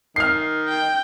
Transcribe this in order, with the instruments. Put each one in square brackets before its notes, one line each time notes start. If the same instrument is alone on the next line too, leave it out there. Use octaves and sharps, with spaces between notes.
[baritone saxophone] D#3 [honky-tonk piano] F6 C7
[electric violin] G5